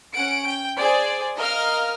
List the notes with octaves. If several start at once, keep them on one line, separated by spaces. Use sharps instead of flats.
C#4 F#5 D7
G5
G#4 C5 D5
A#4 D#5 F5 F6